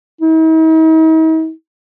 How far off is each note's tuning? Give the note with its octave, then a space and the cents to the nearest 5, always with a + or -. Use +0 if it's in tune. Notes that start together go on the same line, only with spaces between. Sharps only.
D#4 +45